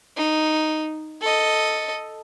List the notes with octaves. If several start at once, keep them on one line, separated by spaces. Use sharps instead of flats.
D#4
A4 D#5